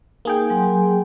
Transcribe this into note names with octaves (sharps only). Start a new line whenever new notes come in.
A#3 D#4 G#4 G5
F#3 G#5 C6